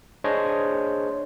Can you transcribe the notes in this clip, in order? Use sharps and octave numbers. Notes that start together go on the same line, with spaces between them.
D4 G#4 C5 C#5 D#5